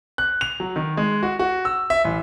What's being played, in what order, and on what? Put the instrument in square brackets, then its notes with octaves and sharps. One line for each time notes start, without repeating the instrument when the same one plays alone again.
[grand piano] F#6
F7
F#3
D#3
G#3
F#4
F#4
E6
E5
A1